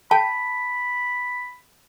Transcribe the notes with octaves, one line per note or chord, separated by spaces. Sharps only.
G5 A5 B5